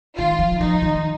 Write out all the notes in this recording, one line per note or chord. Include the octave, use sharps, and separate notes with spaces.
D#3 F4
F3
F3 D#4
D#3